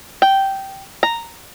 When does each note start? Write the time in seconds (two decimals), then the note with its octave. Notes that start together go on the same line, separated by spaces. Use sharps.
0.22 G5
1.03 A#5